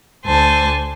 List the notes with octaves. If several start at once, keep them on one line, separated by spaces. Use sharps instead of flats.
D2 C5 G#5 A5